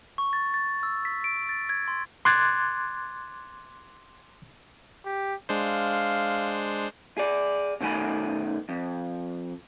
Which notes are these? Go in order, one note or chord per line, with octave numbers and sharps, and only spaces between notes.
C#6
A6
A6
E6
B6
D7
A6
G#6
C6
C6 D6 F#6 G#6 A6
G4
G#3 D4 C5 F5
G#4 D5
B2 D#3 A3 G#5 B5
F2